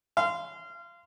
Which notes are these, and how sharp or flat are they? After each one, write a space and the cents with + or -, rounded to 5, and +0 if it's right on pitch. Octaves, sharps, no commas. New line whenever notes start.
F5 -25 C6 -20